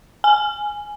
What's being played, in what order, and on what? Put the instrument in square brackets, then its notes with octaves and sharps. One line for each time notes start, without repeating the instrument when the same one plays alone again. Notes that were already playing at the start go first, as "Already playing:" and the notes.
[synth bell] G#5